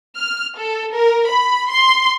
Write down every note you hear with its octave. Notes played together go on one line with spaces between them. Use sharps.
F6
A4
A#4
B5
C6